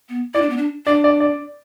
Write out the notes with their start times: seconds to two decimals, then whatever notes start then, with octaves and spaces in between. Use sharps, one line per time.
0.09 B3
0.34 E4 D5
0.42 D4
0.50 B3
0.57 D4
0.86 D4 D5
1.04 D5
1.20 D5